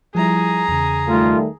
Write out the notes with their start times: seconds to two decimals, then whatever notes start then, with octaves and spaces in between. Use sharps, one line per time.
0.15 F3 G3 E4 G#4 A#5
0.69 E2 C#3
1.09 D#3 G3 A3 F4